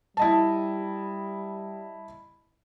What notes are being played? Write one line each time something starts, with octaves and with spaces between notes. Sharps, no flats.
G3 E4 D#5 A5